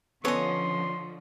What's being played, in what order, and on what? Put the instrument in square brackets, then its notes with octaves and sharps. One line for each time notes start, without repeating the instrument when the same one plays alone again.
[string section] D3 F3 [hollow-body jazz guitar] B3 C#4 A4 [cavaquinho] C#5 D#5 [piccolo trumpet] C6